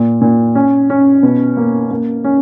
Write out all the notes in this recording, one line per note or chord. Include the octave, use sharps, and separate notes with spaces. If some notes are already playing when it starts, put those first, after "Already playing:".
Already playing: A#2
A#2
C#4
C#4
B2
A#3
A#3
C#4